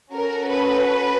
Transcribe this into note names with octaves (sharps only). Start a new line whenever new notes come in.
C#4 F#4 A4 A#4
B4